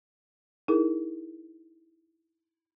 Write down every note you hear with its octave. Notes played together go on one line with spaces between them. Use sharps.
D#4 E4 G#4 A#4